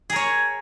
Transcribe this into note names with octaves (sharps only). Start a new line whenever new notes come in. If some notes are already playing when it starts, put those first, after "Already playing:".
G#4 A#4 C#5